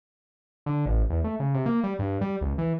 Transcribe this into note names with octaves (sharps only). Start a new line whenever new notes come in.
D3
A1
E2
A3
C#3
C3
A#3
G3
G2
G3
C#2
E3